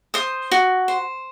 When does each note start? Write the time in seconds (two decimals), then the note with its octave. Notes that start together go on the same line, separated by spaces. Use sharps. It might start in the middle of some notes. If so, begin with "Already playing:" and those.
0.14 C5 D#6
0.51 F#4
0.88 C5